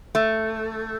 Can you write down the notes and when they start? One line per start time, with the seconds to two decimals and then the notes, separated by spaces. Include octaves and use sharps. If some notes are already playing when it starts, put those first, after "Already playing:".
0.15 A3